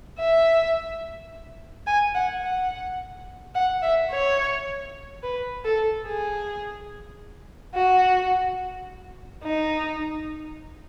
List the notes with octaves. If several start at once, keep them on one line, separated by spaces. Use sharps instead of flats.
E5
G#5
F#5
F#5
F#5
E5
C#5
B4
A4
G#4
F#4
D#4